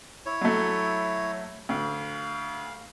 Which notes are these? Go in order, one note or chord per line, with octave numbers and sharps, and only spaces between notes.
E4 C#5
F#3 A3
D2 F5